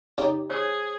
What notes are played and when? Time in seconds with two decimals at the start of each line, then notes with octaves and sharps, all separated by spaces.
0.18 C#3 D#4 G4 D5
0.50 G#4 C5 C#5